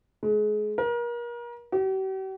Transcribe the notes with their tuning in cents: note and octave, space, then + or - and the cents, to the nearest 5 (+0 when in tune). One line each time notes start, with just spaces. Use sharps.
G#3 +30
A#4 +35
G4 -45